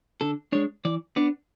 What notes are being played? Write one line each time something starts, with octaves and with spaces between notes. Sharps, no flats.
D3 A4
G#3 D4 C#5
E3 D5
B3 D4 D5